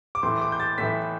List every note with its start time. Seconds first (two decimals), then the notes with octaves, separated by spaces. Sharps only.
0.15 D6
0.23 A2 E3 C6
0.41 D6
0.52 G6
0.60 A6
0.78 A2 E3 B6